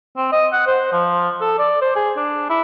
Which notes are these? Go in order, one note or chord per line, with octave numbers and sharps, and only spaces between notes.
C4
D#5
F#5
C5
F3
A4
D5
C5
G#4
D4
E4